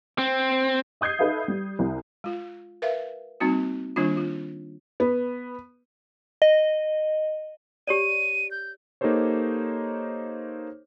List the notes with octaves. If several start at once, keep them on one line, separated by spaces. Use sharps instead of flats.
C4
D#5 D#6 G6 G#6 C7
D#4 A4 B4 E5 F5
G3
C2
G#3 F4
A#4 B4 E5 F5
G3 A#3 C4 D#4 F#4
D#3 G3 A#3 D4 F4
F4
B3
D#5
G4 C#5 D5 D#7
G6
A#3 D#4 G4 A4 C5 C#5